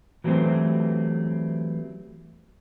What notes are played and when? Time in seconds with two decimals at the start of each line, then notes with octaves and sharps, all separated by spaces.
0.24 E3 F#3 G3 A3 C4